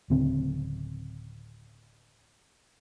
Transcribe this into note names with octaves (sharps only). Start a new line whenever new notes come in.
D1 C#3 C4